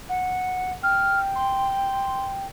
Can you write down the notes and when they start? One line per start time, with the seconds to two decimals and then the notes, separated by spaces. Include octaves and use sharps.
0.09 F#5
0.83 G5 F6
1.35 C6